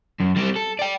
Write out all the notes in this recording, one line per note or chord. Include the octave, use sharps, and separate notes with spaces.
F#2
G3 C4
A4
D5 G5